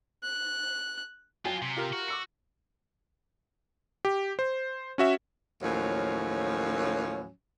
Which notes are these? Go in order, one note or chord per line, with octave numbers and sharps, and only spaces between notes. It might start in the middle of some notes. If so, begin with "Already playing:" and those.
F#6
F#3 F4 A4 G5 G#5
C3
F4 G4 A#4
F#4
D6 E6 C#7
G4
C5
C#4 F#4 E5
D#2 A2 F3 F#3 C#4